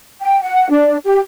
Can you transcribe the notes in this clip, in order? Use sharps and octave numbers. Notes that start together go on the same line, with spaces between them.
G5
F#5
D4
G4